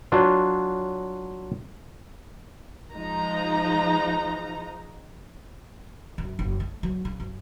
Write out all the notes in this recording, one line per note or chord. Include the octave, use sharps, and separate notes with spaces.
F#3 D4 F4
F3 G#3 D#4 A#5
F#2
F#1
A3
F#3
C#3
F#2